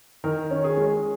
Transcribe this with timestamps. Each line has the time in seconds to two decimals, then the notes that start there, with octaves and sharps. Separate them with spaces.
0.24 D#3 A#4
0.51 C#4
0.64 G#4
0.77 G#3